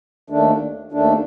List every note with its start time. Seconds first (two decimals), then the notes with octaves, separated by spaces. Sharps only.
0.30 D#2 D#3 A3 D4
0.92 D#2 D#3 A3 D4